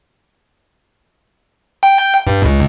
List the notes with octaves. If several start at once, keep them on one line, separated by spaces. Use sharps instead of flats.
G5
G2
C#2